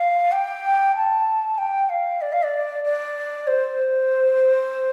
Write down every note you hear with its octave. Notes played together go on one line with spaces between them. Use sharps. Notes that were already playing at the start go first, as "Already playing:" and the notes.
Already playing: F5
G5
A5
G5
F5
D5
F5
D5
D5
C5